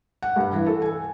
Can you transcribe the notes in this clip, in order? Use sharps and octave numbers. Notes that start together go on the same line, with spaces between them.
F#5
G2
E3
A4
G#5